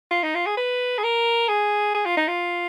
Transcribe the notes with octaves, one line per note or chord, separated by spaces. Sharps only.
F4
D#4
F4
G#4
B4
G#4
A#4
G#4
G#4
F4
D#4
F4